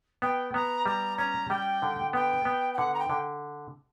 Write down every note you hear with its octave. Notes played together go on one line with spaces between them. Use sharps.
B3 G5
B3 A#5
G3 A#5
C#4 A#5
G3 G5
D3
B3 G5
B3
G5
D3 F#5
A#5
G5
D3